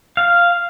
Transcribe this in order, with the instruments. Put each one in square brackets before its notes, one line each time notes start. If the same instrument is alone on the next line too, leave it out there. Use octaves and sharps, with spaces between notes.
[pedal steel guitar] F5